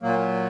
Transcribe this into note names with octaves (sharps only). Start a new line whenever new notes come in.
A#2 F#3 A#3